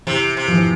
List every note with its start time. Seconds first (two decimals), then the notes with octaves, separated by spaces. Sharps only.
0.07 C3 E3
0.37 C3
0.48 F3
0.53 E3